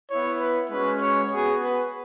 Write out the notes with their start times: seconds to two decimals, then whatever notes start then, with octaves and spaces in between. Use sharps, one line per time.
0.10 B3 E4 C#5
0.40 B4
0.70 G#3 C#4 F#4 B4
1.01 C#5
1.31 B3 F#4 G#4
1.62 B4